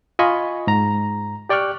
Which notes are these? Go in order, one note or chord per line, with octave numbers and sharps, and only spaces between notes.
F4 D#5 G#5 B5 C#6
G#2 A#5
G4 D5 G5 C#6 F6 F#6